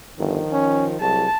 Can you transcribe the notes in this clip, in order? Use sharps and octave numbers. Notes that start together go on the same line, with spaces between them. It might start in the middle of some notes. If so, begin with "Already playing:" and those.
G1 D#3 F3
C#4
C2 F#3 G#4 A5